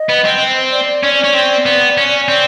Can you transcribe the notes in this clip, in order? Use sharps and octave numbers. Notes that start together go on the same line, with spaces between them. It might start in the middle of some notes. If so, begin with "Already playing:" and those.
Already playing: D#5
B3
C4
D5
C#4 D5
C#4
C4
B3
C#4
C4 D5